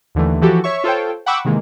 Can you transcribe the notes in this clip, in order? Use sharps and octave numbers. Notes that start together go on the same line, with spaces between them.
D#2 D3 E3 A3
E3 F3 F#4 G4 A4
C#5 E5 C#6
F4 A4 C5 C#5 G5
F#5 G5 B5 C#6 D6 E6
C3 D#3 E3 G#3 A#3